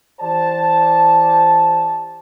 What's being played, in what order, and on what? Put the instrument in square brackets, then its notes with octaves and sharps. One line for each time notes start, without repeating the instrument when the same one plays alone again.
[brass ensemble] E3 G4 C5 D5 A5